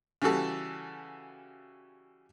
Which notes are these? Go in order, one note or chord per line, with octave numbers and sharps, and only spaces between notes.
C#3 E3 G3 F#4 A4